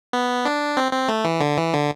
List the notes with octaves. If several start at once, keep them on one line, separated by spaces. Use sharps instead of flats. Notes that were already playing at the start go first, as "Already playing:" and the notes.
B3
D4
C4
C4
A3
E3
D3
E3
D3